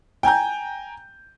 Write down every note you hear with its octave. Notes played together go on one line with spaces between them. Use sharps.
G5 G#5 A#5 G6